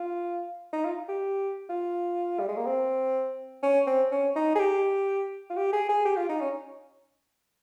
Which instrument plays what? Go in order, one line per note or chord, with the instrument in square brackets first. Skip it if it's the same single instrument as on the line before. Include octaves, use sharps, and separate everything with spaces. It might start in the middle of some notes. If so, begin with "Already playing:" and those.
Already playing: [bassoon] F4
D#4
F4
G4
F4
G3
G#3
A#3
C4
C#4
C4
C#4
D#4
G#4
G4
F4
G4
G#4
G#4
G4
F4
D#4
C#4